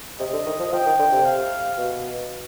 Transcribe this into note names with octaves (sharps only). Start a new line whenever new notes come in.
C3 D#5
D3
D#3
F3
F3 G5
D#3
D3
C3
F5
B2